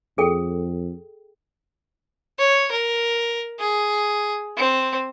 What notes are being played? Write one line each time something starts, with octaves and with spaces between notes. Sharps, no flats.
F2 G#4 A4 G5
C#5
A#4
G#4
C4